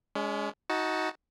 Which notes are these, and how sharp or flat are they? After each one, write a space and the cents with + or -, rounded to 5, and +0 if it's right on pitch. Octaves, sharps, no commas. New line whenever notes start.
G#3 +0 C#4 +40
D#4 +20 F#4 +0 A5 +0